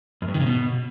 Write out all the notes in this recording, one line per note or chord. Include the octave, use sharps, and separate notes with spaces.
F#2
G2
D#3
C#3
B2